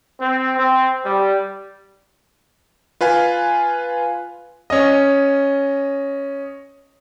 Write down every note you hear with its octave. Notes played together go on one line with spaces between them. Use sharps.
C4
C4
G3
F4 B4 F5 G#5
C#4 D#5